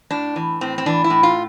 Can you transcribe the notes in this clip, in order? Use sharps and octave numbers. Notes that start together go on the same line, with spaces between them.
A2 D4
E3
A2 C4
C4
E3 D4
E4
A2
F4